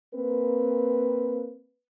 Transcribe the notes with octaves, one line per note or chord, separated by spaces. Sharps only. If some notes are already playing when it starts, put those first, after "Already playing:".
A#3 C4 B4